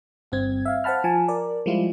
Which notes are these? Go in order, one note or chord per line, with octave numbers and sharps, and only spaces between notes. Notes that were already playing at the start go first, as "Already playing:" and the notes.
G1 G2 C4 G#6
E5 F5
C5 F5 F#5 A5 B5 F6
F3 G#5 A5
A#4 D5
F3 G3 G#3 E4 F4